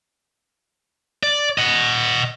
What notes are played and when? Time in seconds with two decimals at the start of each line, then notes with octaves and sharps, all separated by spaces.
1.23 D5
1.58 D#5 F#5